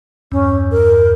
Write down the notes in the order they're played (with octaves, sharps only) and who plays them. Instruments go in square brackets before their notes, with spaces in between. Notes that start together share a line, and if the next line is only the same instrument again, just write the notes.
[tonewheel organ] E2 G2 [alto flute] C#4
[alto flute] A#4